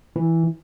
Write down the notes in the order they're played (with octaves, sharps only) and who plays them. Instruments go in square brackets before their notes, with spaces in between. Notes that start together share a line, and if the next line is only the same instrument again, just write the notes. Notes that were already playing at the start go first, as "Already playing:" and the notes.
[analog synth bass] E3